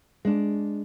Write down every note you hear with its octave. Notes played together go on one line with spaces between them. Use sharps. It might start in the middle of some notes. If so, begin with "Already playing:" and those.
G#3 D4